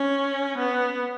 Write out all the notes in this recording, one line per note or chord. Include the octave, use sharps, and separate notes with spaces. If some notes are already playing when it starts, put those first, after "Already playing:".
Already playing: C#4
B3